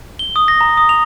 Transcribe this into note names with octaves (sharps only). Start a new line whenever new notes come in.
G7
D#6
A#6
A#5
D#6
F7